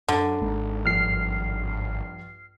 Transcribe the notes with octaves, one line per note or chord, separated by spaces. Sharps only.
F#2 D3
G#1 G#2
A#1 G2 F6 C7